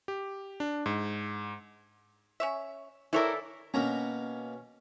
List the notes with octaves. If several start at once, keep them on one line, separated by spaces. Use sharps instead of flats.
G4
D4
G#2
C#4 C#5 E5
E3 E4 A4 A#4 C#5 D5 E5
B2 A#3 C#4 A#5